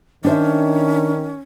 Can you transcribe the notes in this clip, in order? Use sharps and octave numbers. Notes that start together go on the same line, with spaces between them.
D#3 C#4 D4 C5 E5